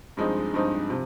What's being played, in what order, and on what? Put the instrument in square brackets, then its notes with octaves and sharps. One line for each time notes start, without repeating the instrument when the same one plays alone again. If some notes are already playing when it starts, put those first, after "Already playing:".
[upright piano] G2 F3 G#3 C4 D#4
G2 F3 G#3 C4 D#4
C3 F3